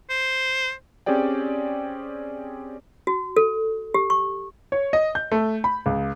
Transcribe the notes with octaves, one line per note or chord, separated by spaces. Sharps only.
C5
C4 C#4 G4 G#4 D5 G5
F#4
A4
G4
C#6
C#5
D#5
G6
A3
B5
C#2